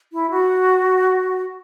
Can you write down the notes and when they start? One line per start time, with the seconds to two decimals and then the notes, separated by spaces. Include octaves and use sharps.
0.13 E4
0.30 F#4